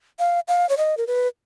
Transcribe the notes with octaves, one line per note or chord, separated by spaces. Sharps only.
F5
F5
C#5
D#5
A#4
B4